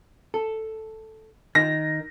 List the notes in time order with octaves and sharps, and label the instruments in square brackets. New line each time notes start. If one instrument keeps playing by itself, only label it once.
[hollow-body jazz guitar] A4
[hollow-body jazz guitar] D#3 [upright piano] A#6